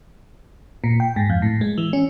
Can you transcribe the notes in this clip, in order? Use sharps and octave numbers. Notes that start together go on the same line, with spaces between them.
A#2
G5
G#2
F2
A2
G#3
E3
C#4